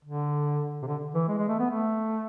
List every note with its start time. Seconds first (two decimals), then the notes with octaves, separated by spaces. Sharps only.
0.05 D3
0.82 C3
0.87 D3
1.14 E3
1.28 G#3
1.38 G#3
1.48 A3
1.59 B3
1.70 A3